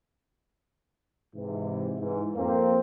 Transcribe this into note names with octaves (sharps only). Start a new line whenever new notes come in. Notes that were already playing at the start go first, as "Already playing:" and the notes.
G#2 C3 E3
G#2 E3
F2 A#3 C4